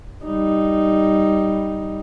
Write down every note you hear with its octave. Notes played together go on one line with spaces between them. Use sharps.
G3 D#4